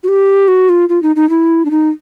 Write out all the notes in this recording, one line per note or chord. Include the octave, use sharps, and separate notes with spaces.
F#4
G4
F#4
F4
F4
D#4
D#4
E4
D4
D#4